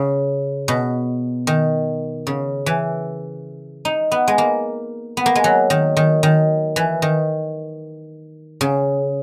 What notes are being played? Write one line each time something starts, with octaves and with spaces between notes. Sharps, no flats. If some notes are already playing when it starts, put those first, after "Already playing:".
Already playing: C#3
B2
D#3
C#3
E3
D#4
B3
G#3
A#3
B3
A#3
G#3
F#3
D#3
D#3
D#3
E3
D#3
C#3